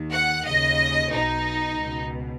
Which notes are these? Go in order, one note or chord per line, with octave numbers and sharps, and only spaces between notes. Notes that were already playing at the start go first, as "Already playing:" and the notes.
Already playing: D#2 D#3
F#5
D#2 C#3 D#5
B1 B2 D#4
C#2 B2